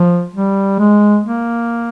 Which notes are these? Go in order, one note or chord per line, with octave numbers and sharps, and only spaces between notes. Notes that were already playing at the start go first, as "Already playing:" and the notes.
Already playing: F3
G3
G#3
A#3